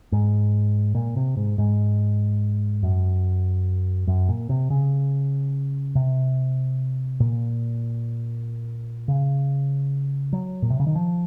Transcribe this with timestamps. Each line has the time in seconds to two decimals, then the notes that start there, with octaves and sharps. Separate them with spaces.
0.12 G#2
0.95 A#2
1.16 C3
1.37 G#2
1.58 G#2
2.83 F#2
4.07 F#2
4.29 A#2
4.49 C3
4.70 C#3
5.95 C3
7.20 A#2
9.08 C#3
10.33 F#3
10.62 A#2
10.70 C3
10.80 C#3
10.87 D#3
10.95 F3